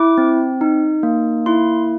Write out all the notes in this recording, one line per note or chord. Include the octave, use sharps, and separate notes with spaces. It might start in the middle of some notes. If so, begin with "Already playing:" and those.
Already playing: E4 D6
C4
D#4
A#3
E4 C6